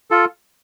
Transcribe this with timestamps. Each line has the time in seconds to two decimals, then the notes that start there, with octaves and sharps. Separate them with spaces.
0.11 F4 A4